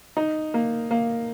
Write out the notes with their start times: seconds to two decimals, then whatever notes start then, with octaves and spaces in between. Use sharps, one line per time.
0.17 D#4
0.54 A#3
0.91 A#3